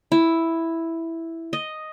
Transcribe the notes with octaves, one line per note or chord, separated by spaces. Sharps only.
E4
D#5